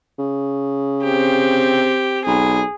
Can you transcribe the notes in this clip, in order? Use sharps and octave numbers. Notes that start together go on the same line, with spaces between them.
C#3
C4 G4
B1 G#4